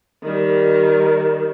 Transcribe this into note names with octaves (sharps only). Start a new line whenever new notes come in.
D#3 G3